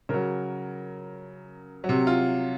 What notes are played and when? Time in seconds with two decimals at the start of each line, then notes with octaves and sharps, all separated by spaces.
0.09 C#3 F#3 A#4
1.84 F#3
1.89 C3
2.07 F4